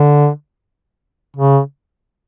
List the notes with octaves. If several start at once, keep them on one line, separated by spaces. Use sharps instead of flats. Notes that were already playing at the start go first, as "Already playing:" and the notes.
Already playing: D3
C#3